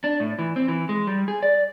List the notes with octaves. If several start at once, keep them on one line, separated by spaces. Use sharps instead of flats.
D4
A2
E3
C4
E3
G#3
G3
G#4
D5